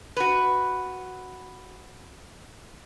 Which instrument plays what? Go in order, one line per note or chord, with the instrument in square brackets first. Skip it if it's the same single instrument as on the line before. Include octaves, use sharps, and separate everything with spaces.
[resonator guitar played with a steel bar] F#4 B4